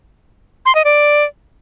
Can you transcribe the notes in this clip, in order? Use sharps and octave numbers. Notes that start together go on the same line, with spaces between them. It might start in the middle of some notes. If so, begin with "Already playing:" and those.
C6
D#5
D5